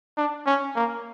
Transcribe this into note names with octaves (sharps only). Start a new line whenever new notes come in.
D4
C#4
A#3